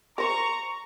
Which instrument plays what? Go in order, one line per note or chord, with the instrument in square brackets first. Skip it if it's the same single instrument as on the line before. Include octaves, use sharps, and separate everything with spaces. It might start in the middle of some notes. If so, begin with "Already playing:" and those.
[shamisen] A#4 C5 [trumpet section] A#5 C#6